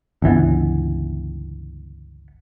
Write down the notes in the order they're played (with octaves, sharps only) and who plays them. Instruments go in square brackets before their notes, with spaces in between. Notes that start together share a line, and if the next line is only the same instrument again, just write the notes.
[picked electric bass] G1 C#2 E3 B3